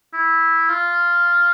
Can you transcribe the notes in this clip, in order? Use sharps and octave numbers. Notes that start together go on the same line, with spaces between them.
E4
F4